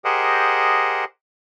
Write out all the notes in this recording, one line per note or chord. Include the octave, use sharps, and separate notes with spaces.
G4 G#4 A#4 C5 D#5 F#5